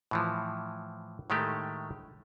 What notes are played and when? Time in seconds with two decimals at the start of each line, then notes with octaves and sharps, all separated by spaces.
0.11 A2 E3 F3
1.30 A2 D#3 G#3 A3 G4